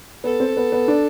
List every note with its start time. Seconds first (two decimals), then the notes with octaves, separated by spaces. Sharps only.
0.23 B3 A4
0.40 C4
0.57 B3
0.72 B3
0.88 D4